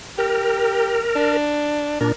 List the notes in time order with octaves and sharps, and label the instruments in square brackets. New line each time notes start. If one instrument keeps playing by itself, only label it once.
[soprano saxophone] G4 [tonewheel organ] A#4
[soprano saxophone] D4
[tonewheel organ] A#2 D4 [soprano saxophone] A#4